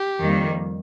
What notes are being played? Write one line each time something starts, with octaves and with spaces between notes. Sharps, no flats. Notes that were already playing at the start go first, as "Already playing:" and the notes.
Already playing: G4
F2 D#3 G3 A#3